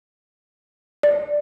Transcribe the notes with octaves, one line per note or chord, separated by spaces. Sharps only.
D5